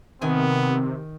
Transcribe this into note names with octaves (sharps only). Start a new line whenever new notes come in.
C3 D#3 B3 C4 G#5